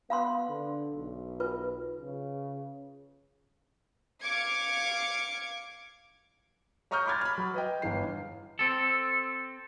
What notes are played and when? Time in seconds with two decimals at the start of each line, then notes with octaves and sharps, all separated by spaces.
0.10 B3 F5 B5 C6
0.49 D3
0.93 B1
1.40 F4 B4
1.99 C#3
4.22 F5 D6 G#6 C#7
6.91 C#5 A#5 C#6 D#6 F6 G6
7.06 B5 C6 D6 F6 G#6 A6
7.21 B5 F6
7.38 F#3
7.54 B4 D#5 G5
7.82 G1 E3 C7
8.59 C4 A4